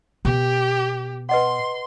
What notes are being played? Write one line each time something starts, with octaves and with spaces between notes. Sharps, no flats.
B2 G4
B4 D#5 F#5 C6